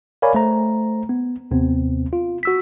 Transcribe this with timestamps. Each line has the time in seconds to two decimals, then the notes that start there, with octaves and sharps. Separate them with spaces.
0.22 A#4 C#5 D5 F5 G#5 B5
0.35 A3 C5 A#5
1.09 B3
1.51 D#2 C3 B3 C4
2.13 F4
2.43 F#4 E6 B6